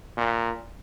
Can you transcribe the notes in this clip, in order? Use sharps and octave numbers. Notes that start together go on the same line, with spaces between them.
A#2